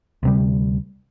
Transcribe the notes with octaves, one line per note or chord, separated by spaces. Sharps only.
D2 C3 G3